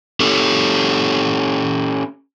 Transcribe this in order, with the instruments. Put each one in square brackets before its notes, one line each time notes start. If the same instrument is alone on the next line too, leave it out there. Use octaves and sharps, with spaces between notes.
[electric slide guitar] C#4 G4 A4